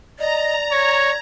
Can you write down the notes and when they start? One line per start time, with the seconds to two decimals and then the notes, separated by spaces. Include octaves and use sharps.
0.19 D5 D#5 A#5
0.72 C#5 G#6